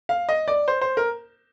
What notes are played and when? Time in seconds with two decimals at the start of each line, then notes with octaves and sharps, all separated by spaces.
0.09 F5
0.29 D#5
0.48 D5
0.68 C5
0.81 C5
0.97 A#4